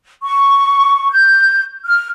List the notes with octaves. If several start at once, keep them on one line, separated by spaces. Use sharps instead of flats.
C#6
G6
F6